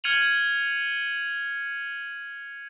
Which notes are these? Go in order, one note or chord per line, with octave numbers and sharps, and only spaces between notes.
F6 G#6 C#7 D#7 F7 F#7